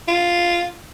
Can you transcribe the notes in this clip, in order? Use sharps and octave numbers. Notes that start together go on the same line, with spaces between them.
F4